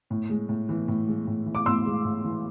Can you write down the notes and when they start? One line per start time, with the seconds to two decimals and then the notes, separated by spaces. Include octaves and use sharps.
0.10 A2
0.30 G#3
0.49 A2
0.69 E3
0.88 A2
1.08 G#3
1.27 A2
1.46 E3
1.55 D6
1.66 A2 C6 E6
1.86 G#3
2.05 A2
2.24 E3